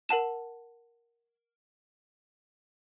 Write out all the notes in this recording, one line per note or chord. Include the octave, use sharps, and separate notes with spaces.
A#4 F#5 A5 E7